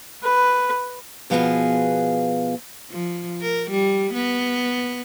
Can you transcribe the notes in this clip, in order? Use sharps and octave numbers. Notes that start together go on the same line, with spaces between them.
B4
B2 F3 B3 F4 F#4 G#4
F3
A#4
G3
B3